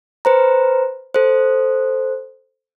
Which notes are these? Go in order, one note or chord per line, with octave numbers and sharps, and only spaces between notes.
B4 C5 A#5
A4 C5